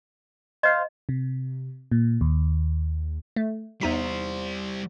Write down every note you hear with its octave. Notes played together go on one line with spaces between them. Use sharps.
C5 D#5 F5 C6
C3
A#2
D#2
A3
E2 G3 D#4 C5 B6